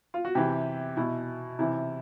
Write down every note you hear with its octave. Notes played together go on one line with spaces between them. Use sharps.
F4
F#4
C3 E3 G4
B2 E4
C3 E3 E4